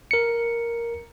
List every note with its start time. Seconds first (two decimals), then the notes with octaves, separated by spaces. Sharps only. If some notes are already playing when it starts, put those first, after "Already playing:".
0.11 A#4 C#7